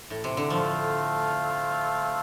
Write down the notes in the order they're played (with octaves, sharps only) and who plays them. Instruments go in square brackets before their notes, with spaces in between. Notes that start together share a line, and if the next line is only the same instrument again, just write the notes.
[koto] A2
C3
D3
[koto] F3 [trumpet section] A3 C4 A4 F5